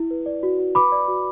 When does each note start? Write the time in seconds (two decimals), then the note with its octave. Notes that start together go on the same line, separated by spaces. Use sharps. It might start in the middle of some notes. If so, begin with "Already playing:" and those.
Already playing: E4
0.11 B4
0.26 D5
0.43 F#4
0.59 F#4
0.75 B4 B5 D6
0.92 D5
1.08 F#4